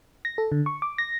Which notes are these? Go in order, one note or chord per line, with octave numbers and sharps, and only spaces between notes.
A#6
A4
D3
C#6
D6
A#6